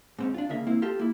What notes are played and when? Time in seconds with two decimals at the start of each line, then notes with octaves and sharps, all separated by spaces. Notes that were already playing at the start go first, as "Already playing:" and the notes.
0.19 G#2 C4 C#4
0.34 D4 F4
0.49 D2 C#3 A#3 E5
0.67 A#3 C4 E4
0.82 F4 G4 A4
0.99 A#3 E4